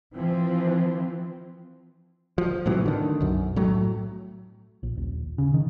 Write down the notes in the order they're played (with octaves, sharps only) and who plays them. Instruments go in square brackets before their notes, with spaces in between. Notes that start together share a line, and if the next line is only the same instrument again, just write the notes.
[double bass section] E3 F3 C4
[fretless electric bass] F3
A2 C3 E3 F#3
D3 D#3
B1 F#2
A2 F#3 A3
[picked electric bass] A#1
D#1
C#3
D#3